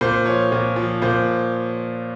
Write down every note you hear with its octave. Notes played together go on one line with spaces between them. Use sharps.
A#2 C5
F3 C#5
A#2
F3
A#2 C5